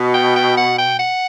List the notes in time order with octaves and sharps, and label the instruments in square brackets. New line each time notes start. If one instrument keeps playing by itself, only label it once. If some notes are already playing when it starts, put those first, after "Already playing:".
Already playing: [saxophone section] B2
[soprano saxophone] G5
G5
F#5
G5
F#5